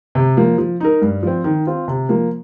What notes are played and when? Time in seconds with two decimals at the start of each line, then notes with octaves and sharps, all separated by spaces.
0.15 C3
0.37 F3 A#3
0.58 F3
0.80 D#4 A#4
1.02 G2
1.23 F3 C4
1.44 D#3
1.67 C4 F4
1.88 C3
2.09 F3 A#3